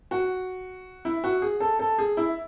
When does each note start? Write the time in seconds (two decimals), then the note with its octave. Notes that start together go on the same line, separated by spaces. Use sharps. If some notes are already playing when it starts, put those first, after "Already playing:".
0.11 F#4
1.05 E4
1.24 F#4
1.42 G#4
1.60 A4
1.79 A4
1.98 G#4
2.17 E4